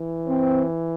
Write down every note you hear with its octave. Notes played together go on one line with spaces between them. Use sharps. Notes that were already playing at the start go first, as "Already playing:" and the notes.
Already playing: E3
C4